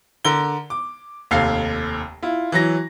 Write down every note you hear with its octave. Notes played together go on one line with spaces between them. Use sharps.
D3 A#4 G7
D6
F1 D#2 A4 F5 C7
E4 F4
E3 F#3 A#6